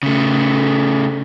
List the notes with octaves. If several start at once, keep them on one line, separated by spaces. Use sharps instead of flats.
C#3 A3